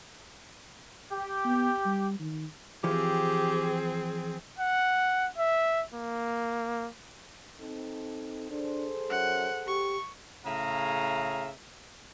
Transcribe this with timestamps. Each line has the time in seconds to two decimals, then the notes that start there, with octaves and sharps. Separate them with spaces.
1.11 G4
1.45 B3
1.85 G3
2.20 D#3
2.84 E3 F3 C4 G4 G#4
4.59 F#5
5.38 E5
5.94 A#3
7.59 C4 D#4 A4
8.50 D4 G#4 A4 C5
9.10 F#2 F#5
9.67 G4 C#6
10.45 A2 C#3 G#4 E5 F5 A#5